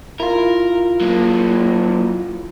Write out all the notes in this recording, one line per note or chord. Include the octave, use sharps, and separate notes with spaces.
E4 F4 A#4
F#3 A#3